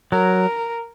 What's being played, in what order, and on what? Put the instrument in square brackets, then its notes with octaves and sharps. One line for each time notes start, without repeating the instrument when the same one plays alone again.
[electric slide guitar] F#3 [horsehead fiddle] A#4